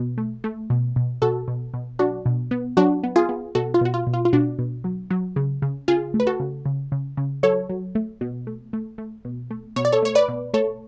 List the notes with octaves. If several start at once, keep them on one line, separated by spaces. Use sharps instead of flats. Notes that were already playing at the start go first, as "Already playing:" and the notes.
Already playing: B2
A3
A3
B2
B2
B2 F#4 A4
B2
B2
F#3 D4 F#4
B2
B3
F#3 D4 F#4
B3
F4 G#4
B3
B2 F#4 A4
F4
B2 F#4
F4
B2
F4
F4
B2 D4 F#4
B2
F#3
F#3
C#3
C#3
C#3 F4 G#4
A3
B4
F#4 A4
C#3
C#3
C#3
C#3
F#3 A4 C#5
F#3
A3
B2
A3
A3
A3
B2
A3
B2 C#5
D5
A4 C#5
A3 C#5
B4 D5
B2
A3 A4 C#5